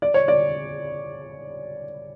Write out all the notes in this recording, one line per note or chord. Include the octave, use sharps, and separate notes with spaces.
D5
C#5
D5